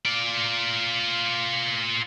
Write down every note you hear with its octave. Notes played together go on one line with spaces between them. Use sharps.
F4 D5